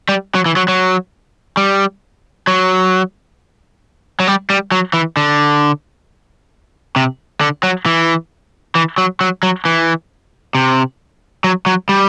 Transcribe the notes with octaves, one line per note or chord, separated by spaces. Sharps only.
G3
F#3
E3
F#3
F#3
G3
F#3
F#3
G3
G3
F#3
E3
D3
C3
D3
F#3
E3
E3
F#3
F#3
F#3
E3
C3
F#3
F#3
G3